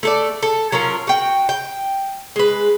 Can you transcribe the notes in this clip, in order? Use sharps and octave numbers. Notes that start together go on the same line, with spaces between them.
A3 A4 D5
A4
F#3 C#4 F4 A#4
F#4 G5
G5
G#3 B4